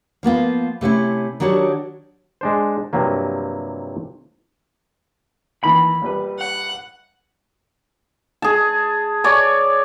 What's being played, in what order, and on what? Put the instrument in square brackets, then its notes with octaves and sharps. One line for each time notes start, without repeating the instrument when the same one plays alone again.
[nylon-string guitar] F3 A#3 B3 F4
C3 A3 C#4 E4
D#3 F#3 D4 F#4 G4 C#5
[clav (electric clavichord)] G#3 D4 C5
G2 C3 F3 F#3 A#3
[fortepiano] D#3 E3 A#3 [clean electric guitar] B5
[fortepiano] A#1 G3 B4
[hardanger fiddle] F#5
[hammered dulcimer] G#4 A5
C#5 D5 G#5